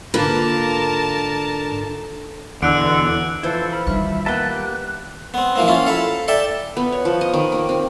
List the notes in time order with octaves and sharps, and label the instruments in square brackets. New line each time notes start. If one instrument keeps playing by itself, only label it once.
[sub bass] G#2 [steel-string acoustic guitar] D3 [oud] A#3 F4 B4 [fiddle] A#4 A5
[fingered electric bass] E2 [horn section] B2 D3 [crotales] E6 F#6 D7
[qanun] E3 F3 C5 [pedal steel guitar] E4 A4 [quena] E6
[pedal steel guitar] B5 [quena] F6
[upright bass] D#3 G3 [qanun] D4 C#6 [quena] E5
[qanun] A#3 B3 G5 [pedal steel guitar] B4 E5 A5 [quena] F#6
[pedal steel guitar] G4
[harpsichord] B3 C4
E3 F3 A#3 C4
A#3 C#4 E4 F4
A4 F5 B5
A4 D5 E5 G5
[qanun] B3
C#5
F3
D#5
D#3
A#3
C4